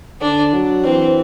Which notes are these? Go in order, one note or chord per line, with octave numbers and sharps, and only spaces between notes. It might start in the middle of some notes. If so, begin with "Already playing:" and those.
D3 D4
F#3
E3 C4